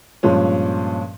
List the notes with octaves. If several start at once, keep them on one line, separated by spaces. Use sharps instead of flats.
G2 A#2 F3 G#3 C#4